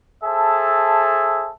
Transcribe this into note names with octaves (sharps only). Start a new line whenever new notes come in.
G#4 A4 C5 E5 A5